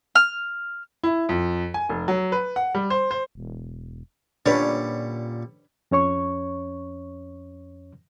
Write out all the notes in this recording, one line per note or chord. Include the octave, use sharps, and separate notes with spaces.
F6
E4
F2
G#5
F1
F#3
B4
F#5
G3
C5
C5
E1
A#2 D3 G3 C#4 D4 B4 C#5
F2 C#4 C#5 C#6